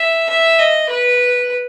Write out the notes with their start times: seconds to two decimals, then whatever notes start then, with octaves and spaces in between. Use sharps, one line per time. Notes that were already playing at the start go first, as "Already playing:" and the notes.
Already playing: E5
0.29 E5
0.59 D#5
0.89 B4